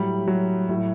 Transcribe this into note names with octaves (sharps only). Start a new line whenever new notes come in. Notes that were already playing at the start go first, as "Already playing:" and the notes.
Already playing: A2 F#3 G3
F#3
A2 F#3